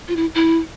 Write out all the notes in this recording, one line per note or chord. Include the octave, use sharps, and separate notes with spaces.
F4
E4
E4